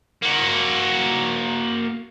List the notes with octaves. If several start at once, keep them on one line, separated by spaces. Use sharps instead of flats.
A#3 F#4